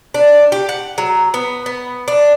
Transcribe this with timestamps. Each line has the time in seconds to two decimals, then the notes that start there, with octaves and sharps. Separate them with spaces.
0.14 D4
0.52 G4
0.69 F#5
0.98 F#3
1.34 B3
1.66 B3
2.08 D4